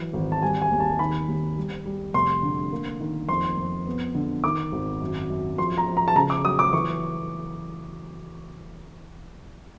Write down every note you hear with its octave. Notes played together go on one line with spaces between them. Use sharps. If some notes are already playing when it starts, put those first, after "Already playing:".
Already playing: E3 F#3
G#1
A5
G3 G#5
G#5
D#2
A5
D#3 B5
D#2
G3
G3
F1 C6
D3
A#3
D#3
F2 C6
F2
B3
D3
D#3 D6
G#1
F#2
F#2
F3 C6
A#5
F3
A#5
A5
C#3 A#5
D6
F#3 D#6
D6
E3 C#6